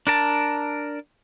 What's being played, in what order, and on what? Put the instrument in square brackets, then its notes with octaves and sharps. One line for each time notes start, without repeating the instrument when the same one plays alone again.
[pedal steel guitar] D4 A#4 A5